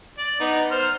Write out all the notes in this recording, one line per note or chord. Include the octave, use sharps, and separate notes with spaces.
D5
B3 D#4
C5 F6